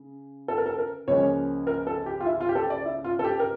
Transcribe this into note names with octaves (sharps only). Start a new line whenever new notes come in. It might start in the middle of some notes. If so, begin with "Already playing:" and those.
Already playing: C#3
A4
A#4
A4
A#4
C#2 C#3 F3 A#3 C#4 C#5
A#4
A4
G4
F4
E4
F4
G4
A4
D5
E4
F4
A4
G4
A#4